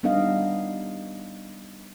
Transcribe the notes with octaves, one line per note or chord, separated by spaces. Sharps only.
G3 B3 D4 D#4 D#5 F5